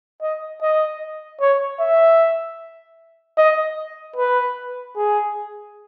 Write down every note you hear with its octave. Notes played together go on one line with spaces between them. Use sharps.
D#5
D#5
C#5
E5
D#5
B4
G#4